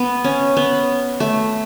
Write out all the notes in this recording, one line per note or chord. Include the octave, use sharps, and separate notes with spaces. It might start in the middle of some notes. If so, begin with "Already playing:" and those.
Already playing: B3
C#4
B3
A3